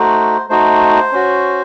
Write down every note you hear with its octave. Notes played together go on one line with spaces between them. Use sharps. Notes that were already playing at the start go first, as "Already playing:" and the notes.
Already playing: A3 D#4 F#4 C5
A3 D#4 F#4 C5
C#4 F#4